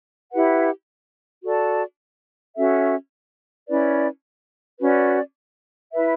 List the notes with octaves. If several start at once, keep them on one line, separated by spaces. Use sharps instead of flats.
E4 G4 B4 F#5
F#4 A4 D5 A5
C#4 F#4 A4 E5
C#4 E4 B4 D5
C#4 F#4 B4 D5
E4 B4 E5